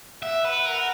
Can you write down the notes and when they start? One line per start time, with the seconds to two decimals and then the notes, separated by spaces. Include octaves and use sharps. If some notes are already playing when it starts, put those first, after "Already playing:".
0.23 E5 F#5
0.45 B4
0.66 A#4